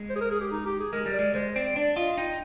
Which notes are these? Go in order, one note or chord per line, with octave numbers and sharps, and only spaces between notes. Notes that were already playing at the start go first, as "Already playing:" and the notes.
Already playing: G#3
C5
G#4
A#4
G#4
G4
D#4
G4
G#4
G#3 A#4
G3
D5
G#3
G#3 C5
C4 D5
D4 D5
F4 D#5
D#4 G5